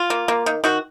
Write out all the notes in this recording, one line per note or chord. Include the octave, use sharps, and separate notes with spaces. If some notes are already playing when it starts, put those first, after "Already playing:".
Already playing: F4
A#3
A#3
D#3
D#3 F#4